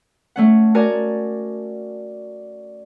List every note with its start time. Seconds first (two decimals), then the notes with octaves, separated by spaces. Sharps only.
0.36 A3 C#4 F#5
0.74 F#4 A#4 D5 G#5 A5